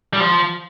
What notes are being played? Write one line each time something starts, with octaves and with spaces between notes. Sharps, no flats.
G3
F3